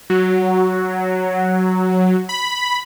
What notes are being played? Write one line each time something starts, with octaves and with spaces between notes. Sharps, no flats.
F#3
B5